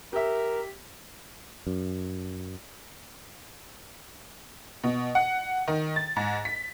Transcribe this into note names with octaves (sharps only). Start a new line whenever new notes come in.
G4 A#4 E5
F#2
B2
F#5
D#3
A6
G#2
B6